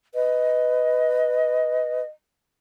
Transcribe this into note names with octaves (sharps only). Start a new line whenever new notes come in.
B4 D#5